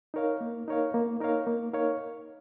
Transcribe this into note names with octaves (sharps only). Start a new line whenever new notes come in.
D#4 A#4 C#5 F5
A#3
D#4 A#4 C#5 F5
A#3
D#4 A#4 C#5 F5
A#3
D#4 A#4 C#5 F5